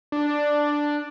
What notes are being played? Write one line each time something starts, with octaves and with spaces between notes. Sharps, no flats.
D4